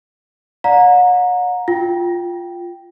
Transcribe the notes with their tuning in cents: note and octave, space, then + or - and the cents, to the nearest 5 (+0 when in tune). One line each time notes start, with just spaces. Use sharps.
D5 -10 F#5 -40 A#5 +0
F4 +0 G5 +0